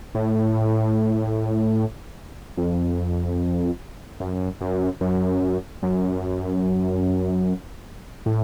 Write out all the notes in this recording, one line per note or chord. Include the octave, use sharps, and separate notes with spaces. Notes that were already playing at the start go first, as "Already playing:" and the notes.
A2
F2
F#2
F#2
F#2
F#2
A2